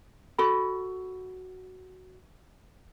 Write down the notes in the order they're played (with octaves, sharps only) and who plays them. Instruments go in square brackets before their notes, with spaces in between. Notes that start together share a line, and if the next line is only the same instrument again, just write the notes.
[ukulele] F#4 A4 B5